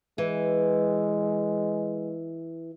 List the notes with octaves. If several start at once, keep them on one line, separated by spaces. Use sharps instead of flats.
E3 G#3